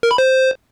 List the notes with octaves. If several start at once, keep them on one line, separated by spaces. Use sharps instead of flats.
A#4
B5
C5